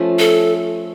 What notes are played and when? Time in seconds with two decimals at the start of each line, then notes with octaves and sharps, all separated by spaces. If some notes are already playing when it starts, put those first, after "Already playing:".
Already playing: F3 A3 C#4
0.19 A4